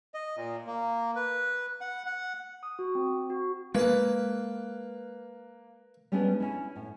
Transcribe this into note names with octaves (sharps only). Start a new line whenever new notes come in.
D#5
A#2
A#3
B4
F#5
F#5
D#6
F#4
C4
F#4
G#3 A#3 B4 A5
G3 G#3 B3 C#4 D4 G#4
C#4 E4
A2